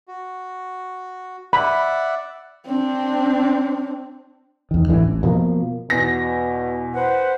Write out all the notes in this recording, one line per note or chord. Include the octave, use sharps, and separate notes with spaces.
F#4
D5 E5 F#5 B5
C4 D4
E2 D#3
D1 G#1 D3 E3
A1
G2 B2 F3 A#3
E2 B2 A#6
B4 C5 F#5